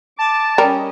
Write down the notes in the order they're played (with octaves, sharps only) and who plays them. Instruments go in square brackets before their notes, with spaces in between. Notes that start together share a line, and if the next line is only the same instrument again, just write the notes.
[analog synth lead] A5 [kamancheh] D6
[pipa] G3 [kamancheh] C#4 D#5 [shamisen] A#4